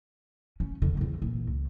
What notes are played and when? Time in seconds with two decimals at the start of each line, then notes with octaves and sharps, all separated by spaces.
0.60 C#4
0.82 E2 D3
0.97 E2 C4
1.22 A#2 E3
1.47 C#2